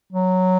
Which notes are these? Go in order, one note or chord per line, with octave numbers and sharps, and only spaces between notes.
F#3